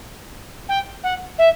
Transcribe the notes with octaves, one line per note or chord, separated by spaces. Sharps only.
G5
F#5
E5